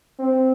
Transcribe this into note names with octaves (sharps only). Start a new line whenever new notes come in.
C4